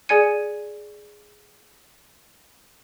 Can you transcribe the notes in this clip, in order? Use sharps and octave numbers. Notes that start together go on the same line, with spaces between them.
G#4 D5 G#5 G#6 C#7 D#7